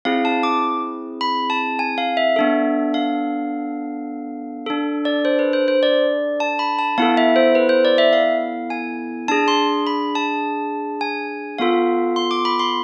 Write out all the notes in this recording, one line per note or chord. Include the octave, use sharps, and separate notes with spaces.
C4 E4 G#4 F5
A5
D6
B5
A5
G#5
F5
E5
B3 D4 A4
F5
D4 A4
D5
C5
B4
C5
C5
D5
A5
B5
A5
B3 E4 A4 F5
E5
C5
B4
C5
D5
E5
F5
G#5
D4 G#4 A5
C6
B5
A5
G#5
B3 F4 A4 F5
C6
D6
B5
C6